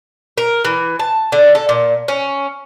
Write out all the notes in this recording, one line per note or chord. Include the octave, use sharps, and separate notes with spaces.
A#4
E3
A5
D3
A4
A#2
C#4